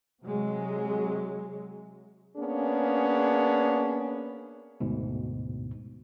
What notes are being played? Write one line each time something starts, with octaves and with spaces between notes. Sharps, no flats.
C3 F#3 G#3
A#3 B3 C#4 D4 G#4
D2 G#2 B2